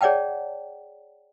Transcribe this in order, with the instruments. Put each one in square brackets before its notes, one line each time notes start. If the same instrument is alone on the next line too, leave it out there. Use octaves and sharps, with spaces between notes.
[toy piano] G#4 C#5 D5 F#5 G5 A5